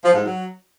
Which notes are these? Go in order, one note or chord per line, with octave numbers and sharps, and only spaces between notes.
F3
G#2
F#3